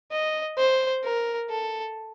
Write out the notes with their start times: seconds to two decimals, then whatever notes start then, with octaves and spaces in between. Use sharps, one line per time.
0.11 D#5
0.58 C5
1.04 A#4
1.50 A4